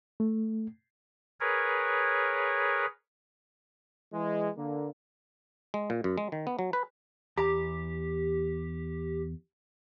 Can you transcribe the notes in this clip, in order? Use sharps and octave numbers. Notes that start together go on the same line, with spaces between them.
A3
G#4 A#4 B4 C#5
E3 G#3
D3 A#3
G#3
A#2
F#2
G#3
D#3
B3
F#3
B4
E2 G4 A#5